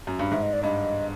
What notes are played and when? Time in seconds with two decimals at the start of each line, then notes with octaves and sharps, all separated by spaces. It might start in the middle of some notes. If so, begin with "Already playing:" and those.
0.07 F#2
0.19 G2
0.31 G#2 E5
0.42 D#5
0.53 D5
0.63 G2 D#5